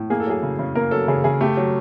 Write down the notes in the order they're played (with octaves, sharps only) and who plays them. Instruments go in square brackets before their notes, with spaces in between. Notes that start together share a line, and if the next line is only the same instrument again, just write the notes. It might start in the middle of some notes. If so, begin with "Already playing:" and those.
Already playing: [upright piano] A2
A#3 G#4
A4
F#3 G#4
C#3
C#3
A#3 A#4
F#3 A4
C#3 G#4
C#3 G#4
A3 G4
F#3